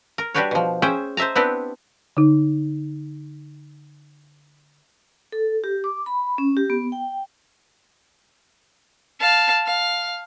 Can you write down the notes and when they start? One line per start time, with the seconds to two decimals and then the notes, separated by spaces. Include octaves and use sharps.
0.18 A#4
0.34 G3 D4 F#4 G4 B4 C#5
0.51 B2 F3
0.82 C#4 G#4 C5 E5 G5
1.17 C5 D#5 E5 A5 A#5
1.36 B3 C4 D4 E4 G4 B4
2.17 D3 D#4
5.32 A4
5.64 G4
5.84 D6
6.06 B5
6.38 C#4
6.57 G4
6.70 B3
6.92 G5
9.20 F5 A5
9.66 F5